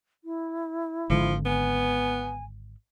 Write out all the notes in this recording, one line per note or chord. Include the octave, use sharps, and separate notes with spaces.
E4
G#1 D3 F3 G#3
B3 G#5